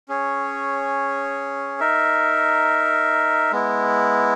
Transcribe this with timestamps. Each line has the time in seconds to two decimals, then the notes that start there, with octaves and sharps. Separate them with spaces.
0.08 C#4 G#4 C#5
1.80 D#4 A#4 E5
3.51 G#3 B3 E4